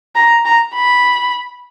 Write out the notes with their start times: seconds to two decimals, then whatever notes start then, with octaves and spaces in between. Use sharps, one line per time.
0.16 A#5
0.45 A#5
0.75 B5